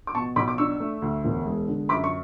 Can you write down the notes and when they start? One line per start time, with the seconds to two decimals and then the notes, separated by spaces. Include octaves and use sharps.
0.07 D6
0.15 B2 A5 C#6
0.36 B1 B5 D6
0.48 D6
0.58 D4 C#6 E6
0.80 A3
1.02 D2
1.24 E1
1.46 G#3
1.68 D3
1.89 F#2 B5 D6
2.04 C#6